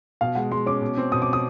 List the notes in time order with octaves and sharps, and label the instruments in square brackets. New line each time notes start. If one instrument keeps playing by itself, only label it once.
[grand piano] B2 [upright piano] F5
[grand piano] G#3 [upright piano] F#5
[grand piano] G#3 [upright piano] C6
[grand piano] C#4 [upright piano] D6
[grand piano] B2
C4
[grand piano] B2 [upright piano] D#6
[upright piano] D6
D#6